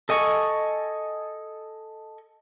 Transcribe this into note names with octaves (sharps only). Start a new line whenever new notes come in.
A4 D#5 G#5 C#6